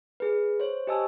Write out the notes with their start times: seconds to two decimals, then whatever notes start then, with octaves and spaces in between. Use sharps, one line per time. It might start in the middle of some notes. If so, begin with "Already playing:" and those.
0.20 G#4 B4
0.60 C5 C#5
0.87 G4 C5 D#5 G#5 A5 E6